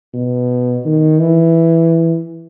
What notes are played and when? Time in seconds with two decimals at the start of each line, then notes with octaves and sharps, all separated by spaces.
0.14 B2
0.85 D#3
1.20 E3